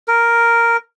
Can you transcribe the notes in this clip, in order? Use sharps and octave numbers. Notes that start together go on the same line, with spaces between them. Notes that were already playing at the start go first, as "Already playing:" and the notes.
A#4